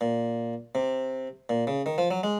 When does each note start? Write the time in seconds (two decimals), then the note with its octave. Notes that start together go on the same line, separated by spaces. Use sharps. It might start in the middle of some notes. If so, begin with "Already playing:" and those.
0.01 A#2
0.75 C3
1.49 A#2
1.67 C#3
1.86 D#3
1.98 F3
2.11 F#3
2.23 G#3